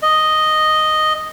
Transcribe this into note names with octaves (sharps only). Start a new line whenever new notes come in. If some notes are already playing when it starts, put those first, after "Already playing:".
D#5